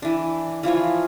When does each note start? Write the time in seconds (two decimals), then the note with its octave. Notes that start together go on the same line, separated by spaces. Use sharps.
0.02 E3 D4
0.63 E3 F3 F4 C#5